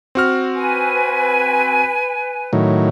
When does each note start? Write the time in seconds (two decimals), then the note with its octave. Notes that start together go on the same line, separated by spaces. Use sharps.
0.15 C4 F#4 F6
0.55 B4 G#5
2.53 A2 D#3 F#3